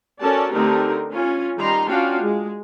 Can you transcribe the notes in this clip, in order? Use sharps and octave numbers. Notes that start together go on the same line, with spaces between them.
C#4 F#4 A4 A#4 D5 A5
D3 A3 C4 D#4 G4 A#4
C#4 F4 G#5
D#3 G3 D#4 A#5 C6
C#4 D4 F4 F#4 F5 G5
G#3